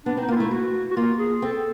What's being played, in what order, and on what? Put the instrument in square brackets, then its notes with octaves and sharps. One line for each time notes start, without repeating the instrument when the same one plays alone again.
[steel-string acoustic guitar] B3 [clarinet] D4
[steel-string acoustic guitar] C4
[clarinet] D#4
[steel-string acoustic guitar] A#3
[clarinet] F4
[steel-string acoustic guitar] A3 [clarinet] E4
[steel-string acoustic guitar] A3 [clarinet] F#4
[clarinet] F#4
[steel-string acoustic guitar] A#3 [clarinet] F4
[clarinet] G#4
[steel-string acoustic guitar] C4 [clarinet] A4